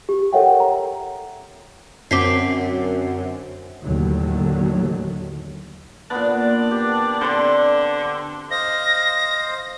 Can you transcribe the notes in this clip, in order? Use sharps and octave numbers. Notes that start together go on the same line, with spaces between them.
G4
A4 A#4 C#5 E5 F#5 G5
A#5
F#2 D3 C4 D6 B6 C7
D#2 A2 D3 D#3 F#3
A#2 B3 D4
G4
D3 C4 D5
C5 D#5 F5 A#6